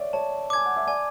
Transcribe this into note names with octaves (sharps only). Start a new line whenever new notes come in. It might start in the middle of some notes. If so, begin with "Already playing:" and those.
Already playing: C#5 D5 E5 F#5
C#5 A5
G#5 D6 G#6
F#5
E5
D5 G#5